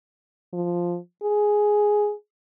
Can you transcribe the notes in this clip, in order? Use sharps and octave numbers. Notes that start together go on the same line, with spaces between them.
F3
G#4